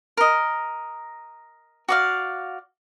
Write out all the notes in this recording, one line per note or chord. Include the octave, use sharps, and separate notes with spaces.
A#4 D#5
F#4 D5 F5